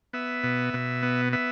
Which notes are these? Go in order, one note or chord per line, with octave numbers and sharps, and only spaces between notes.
B3 E5
B2
B2
B3
B3 E5